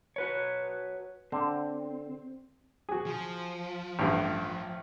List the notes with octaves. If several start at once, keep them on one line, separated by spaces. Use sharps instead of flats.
F#4 B4 C#5
D3 C4
F#4 G#4
F3
A1 G2